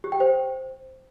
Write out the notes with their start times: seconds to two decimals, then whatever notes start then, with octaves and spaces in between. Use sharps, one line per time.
0.04 G4
0.12 G5
0.20 C5